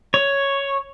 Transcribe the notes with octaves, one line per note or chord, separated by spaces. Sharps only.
C#5